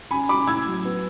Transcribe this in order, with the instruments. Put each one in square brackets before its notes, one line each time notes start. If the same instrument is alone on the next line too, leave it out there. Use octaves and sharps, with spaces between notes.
[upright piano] C#4 G#5 B5
C#4 B5 D6
A2 E6 G#6
F#3
B3